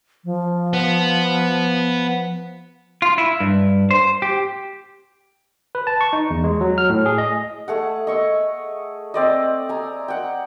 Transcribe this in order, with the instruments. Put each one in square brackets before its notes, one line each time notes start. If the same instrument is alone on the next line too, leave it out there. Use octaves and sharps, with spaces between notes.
[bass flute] F3
[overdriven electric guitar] B3
[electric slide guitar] F4
E4
G2
C5
G4
[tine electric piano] B4
A5
C#6
D#4
E2
G#3
F#3
F6
A2
G#4
D#5
[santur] A3 G#4 F#5
D#5 C#6 E6
C4 D5 D#5
G#5 A#5
F#5 G5